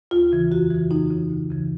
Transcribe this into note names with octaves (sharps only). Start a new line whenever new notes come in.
D#2 F4
C#3 E3
F2 F#4
C#3 E3
F2 D#4
C#3 E3
D2
C#3 E3